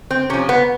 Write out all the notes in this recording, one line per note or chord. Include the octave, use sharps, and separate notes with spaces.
C4
C3 F3 C#4
B3